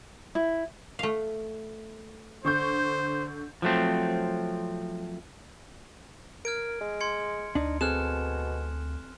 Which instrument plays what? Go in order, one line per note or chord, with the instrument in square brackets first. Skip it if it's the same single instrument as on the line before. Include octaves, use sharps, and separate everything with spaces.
[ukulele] E4
[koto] A3 F5
[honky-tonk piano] D3 C#6 G6 [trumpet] C5
[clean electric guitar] F3 F#3 A3 C4
[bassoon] A#4 [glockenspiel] F6 G#6 D7
[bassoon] G#3
[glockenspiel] C6 G#6 C#7
[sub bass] D2 [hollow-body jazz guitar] D4 D#4
[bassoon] B2 [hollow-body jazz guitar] C4 G#4 A4 [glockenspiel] F6 F#6 E7